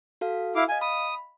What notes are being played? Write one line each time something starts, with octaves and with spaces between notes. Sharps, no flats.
F#4 A4 F5
E4 F5 D6
D#5 F5 G#5
B5 D#6